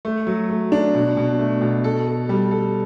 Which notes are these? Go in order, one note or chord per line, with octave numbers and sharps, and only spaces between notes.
A3
F#3
A3
D4
B2
B2
A3
B2
A4
A4
G3
A4